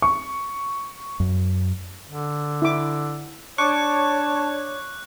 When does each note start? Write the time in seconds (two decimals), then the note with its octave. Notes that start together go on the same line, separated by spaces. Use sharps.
0.02 C#6
1.20 F#2
2.08 D3
2.62 E4 D6
3.58 D4 C#5 A5 C#6 D6 F#6